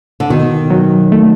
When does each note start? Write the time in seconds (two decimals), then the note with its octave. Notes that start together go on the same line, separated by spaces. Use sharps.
0.20 D3
0.30 B2 D#3
0.70 F#3
1.12 A3